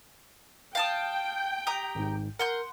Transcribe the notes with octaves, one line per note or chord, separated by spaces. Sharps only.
F5 G5 A5 D#6
G4 A#5 D#6
G#1 G#2
A#4 F#5 C6 G6